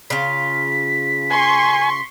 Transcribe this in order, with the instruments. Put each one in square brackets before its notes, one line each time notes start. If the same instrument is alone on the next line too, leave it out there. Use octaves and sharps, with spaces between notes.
[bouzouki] C#3 F4 [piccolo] B6
[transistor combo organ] G#5 [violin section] C6 C#6